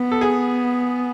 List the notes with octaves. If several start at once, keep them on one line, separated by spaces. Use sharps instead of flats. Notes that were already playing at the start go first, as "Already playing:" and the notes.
Already playing: B3
A4
G#4